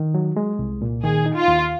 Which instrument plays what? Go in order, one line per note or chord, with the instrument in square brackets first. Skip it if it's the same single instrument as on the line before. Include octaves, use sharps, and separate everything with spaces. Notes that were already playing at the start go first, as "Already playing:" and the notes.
Already playing: [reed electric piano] D#3
F#3
G#3
C2
A#2
[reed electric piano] D#3 [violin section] G#4
[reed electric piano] D#4
[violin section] F4
[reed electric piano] D#2